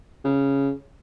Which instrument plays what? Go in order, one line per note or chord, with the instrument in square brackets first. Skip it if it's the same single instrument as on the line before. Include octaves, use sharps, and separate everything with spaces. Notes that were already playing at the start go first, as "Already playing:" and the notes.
[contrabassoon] C#3